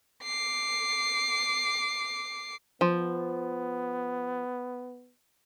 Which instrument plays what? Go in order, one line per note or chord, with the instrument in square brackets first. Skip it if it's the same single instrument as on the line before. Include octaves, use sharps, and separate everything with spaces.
[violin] D6 C7
[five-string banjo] F3 [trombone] B3